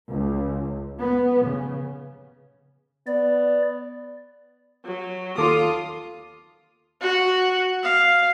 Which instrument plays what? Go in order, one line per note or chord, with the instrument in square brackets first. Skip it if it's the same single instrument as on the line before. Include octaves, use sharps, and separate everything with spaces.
[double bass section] C#2
B3
C#3
[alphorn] B3 [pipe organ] D5
[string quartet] F#3
[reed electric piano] D#2 A4 D6 [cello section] F4 [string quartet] D#6
[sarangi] F#4
F5